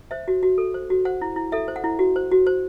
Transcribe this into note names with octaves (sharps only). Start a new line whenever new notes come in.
C5 E5
F#4
F#4
A4
C5
F#4
C5 F#5
E4
E4
A4 E5
C5
F#5
E4
F#4
C5
F#4
C5